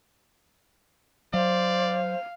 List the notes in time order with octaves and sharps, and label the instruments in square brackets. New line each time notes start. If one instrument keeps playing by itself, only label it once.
[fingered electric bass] F#3 [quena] C5 [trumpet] D5 [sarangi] F5